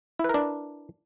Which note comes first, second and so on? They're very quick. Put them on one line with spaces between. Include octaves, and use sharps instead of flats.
E4 B4 A#4 D4